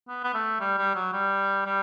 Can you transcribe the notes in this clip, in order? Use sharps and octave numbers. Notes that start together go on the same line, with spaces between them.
B3
B3
A3
G3
G3
F#3
G3
G3